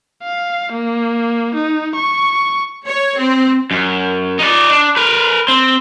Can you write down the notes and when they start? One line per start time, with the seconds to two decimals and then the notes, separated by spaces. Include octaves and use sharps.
0.23 F5
0.72 A#3
1.55 D#4
1.95 C#6
2.85 C#5
3.18 C4
3.71 F#2
4.39 D#4 D5
4.71 D4
4.96 A#4 B4
5.48 C4